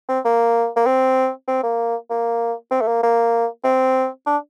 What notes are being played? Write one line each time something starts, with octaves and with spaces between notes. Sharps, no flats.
C4
A#3
A#3
C4
C4
A#3
A#3
C4
A3
A#3
A#3
C4
D4